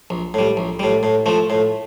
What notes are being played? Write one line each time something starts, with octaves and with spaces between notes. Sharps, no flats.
A#1
A2 G3
A#1
A2 G3
A2
F3 A3
A2